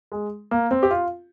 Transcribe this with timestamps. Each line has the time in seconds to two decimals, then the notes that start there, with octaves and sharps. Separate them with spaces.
0.12 G#3
0.51 A#3
0.71 C4
0.83 G4
0.91 F4